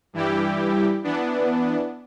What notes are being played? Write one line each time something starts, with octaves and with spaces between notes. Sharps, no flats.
G2 E3 G3 E4 G4
E3 B3 D4